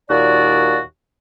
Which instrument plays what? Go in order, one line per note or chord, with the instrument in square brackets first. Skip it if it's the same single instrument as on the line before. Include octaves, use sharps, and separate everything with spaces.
[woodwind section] D#2 A#2 F#4 D5